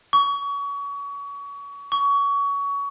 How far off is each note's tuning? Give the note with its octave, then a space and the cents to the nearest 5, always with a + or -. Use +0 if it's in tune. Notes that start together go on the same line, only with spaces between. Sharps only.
C#6 +30
C#6 +25